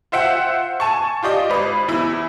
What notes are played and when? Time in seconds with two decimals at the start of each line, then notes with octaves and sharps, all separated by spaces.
0.12 F4 C5 E5 F#5 G5
0.80 G#5 A5 C#6
1.23 F4 G4 D5 D#5
1.49 G#1 B4
1.88 E2 E4 E6